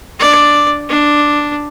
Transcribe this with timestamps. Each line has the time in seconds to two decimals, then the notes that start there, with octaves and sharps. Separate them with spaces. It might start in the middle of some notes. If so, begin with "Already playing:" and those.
0.20 D4 D5
0.89 D4